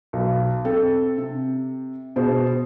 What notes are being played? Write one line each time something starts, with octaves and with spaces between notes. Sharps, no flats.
B1
C4 A4
C3
B2 G#4 C5